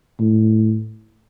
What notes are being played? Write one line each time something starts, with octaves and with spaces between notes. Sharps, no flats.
A2